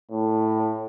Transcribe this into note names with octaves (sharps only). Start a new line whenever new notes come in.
A2